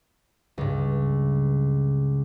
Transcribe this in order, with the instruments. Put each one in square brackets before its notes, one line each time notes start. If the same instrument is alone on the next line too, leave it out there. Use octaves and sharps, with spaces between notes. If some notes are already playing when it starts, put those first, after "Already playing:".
[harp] C#2 G2